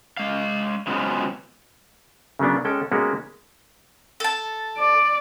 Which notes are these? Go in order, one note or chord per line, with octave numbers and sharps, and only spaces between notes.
G#3 F5
C#3 F3 F#3 G#3 B3 C4
C#3 F#3 A#3 B3 D4
G#3 C#4 A4 G5
G#3 A#3 B3 C#4 F#4 G4
A4 A5
D5